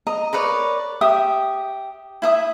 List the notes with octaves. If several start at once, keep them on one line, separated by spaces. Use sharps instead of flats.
D#5 A#5
A#4 B4 C#5 D5
G4 E5 D#6
E4 E5 D#6